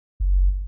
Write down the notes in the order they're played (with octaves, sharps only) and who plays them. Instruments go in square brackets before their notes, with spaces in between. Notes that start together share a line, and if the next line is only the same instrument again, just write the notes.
[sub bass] F#1